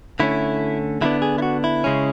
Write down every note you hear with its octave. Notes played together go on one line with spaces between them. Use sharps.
D3 A3 C#4 E4
D3 G#3 B3 D4 E4
G#4
E4
F#4
E4
C#3 G#3 C#4